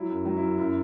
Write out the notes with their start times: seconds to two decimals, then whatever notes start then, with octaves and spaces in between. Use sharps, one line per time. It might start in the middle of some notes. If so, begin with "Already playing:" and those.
Already playing: F#3 E4
0.09 F#2
0.25 F#3
0.37 E4
0.42 F#2
0.58 F#2 E4